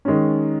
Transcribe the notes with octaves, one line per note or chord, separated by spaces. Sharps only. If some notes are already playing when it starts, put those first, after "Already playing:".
D#3 G#3 C#4